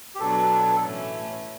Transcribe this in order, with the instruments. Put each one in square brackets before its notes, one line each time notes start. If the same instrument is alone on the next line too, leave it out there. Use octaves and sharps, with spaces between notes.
[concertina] G4
[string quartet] B2 F#3 B3 D4 [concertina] A4
[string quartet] A2 E3 A3 C#4